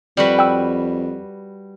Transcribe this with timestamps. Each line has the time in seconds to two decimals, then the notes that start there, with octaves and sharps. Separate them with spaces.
0.17 F2 G3 F#4 B4
0.39 G5 E6